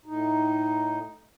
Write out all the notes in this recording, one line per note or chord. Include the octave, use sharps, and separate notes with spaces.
A2 D#4